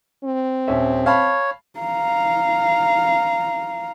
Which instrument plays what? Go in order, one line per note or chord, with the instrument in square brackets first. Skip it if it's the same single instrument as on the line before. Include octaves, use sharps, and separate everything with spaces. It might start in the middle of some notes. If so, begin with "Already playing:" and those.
[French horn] C4
[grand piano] D#1 C#4 E5
[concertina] C#5 [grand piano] F5 A5 B5
[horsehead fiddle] F5 A#5